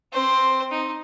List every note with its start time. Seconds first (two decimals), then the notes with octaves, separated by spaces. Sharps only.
0.12 C4 C5
0.71 D#4